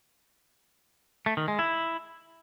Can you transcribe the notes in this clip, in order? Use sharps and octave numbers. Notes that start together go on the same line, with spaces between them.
A3
D#3
G#3
E4